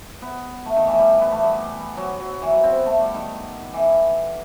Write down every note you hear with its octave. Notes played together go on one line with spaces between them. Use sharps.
B3
A3
D#3
E3
G3
B3
A3
G3
F#3
F#3
E3
F#3
C4
B3
A3
G3
D#3
E3